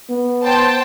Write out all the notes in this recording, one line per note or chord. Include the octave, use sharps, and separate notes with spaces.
B3
C5 G5 A5